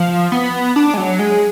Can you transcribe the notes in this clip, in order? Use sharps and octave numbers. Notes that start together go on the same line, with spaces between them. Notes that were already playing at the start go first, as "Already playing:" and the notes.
Already playing: F3
B3
D4
G#3
F#3
G#3